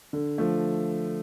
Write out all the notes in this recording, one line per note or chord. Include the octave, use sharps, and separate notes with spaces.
D3
F3 A3